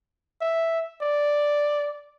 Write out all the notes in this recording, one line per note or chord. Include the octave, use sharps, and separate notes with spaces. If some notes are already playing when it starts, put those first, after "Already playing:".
E5
D5